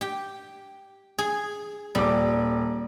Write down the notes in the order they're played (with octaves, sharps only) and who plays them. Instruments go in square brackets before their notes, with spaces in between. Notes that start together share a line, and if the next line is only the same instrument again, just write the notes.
[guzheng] G4 G5
G#4
[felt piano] D#1 D6 [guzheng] G3